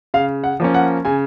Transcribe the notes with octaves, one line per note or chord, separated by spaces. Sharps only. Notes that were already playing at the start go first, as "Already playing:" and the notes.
C#3 F5
F#5
F3 A#3 C#4
F#5
C#3 G#5